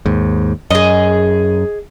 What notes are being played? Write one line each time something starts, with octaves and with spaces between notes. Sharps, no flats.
D#2 G#2
F#2 G#4 D#5